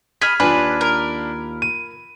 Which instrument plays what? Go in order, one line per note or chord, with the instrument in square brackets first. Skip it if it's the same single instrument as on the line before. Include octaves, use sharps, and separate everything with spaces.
[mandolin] G#4 D#5 B5 [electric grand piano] F6 G#6 B6
[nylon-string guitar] D#2 F4 G#5 [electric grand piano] D4 [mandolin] B4 [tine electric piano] B5
[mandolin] A#4
[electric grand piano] D#7